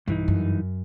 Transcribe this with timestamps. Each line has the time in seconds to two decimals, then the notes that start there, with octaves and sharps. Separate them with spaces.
0.08 B1 G2 E3 D#4
0.28 F#2